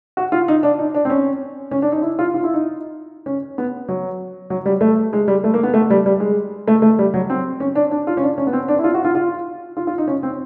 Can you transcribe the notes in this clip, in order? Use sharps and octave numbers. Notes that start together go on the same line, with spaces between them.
F#4
F4
D#4
D4
D#4
D4
C4
C#4
C#4
D4
D#4
E4
F4
F4
E4
D#4
C#4
B3
F#3
F#3
G3
A3
G#3
G3
A3
A#3
B3
A3
G3
G3
G#3
A3
A3
G3
F#3
C4
C#4
D4
D4
F4
C#4
D4
C#4
B3
C4
D4
E4
F4
F#4
F4
F4
F4
F4
D#4
C#4
C4